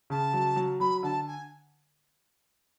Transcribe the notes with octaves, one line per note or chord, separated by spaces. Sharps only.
C#3 A5
F#3
F#3
F#3 B5
D3 A5
G#5